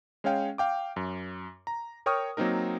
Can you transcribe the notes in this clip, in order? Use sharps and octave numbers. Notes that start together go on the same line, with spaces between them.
G#3 C#4 C#5 F5 G5
F5 G5 D6
F#2
A#5
A#4 C#5 G5 C#6 D#6 F6
F#3 A#3 C4 D#4 A#4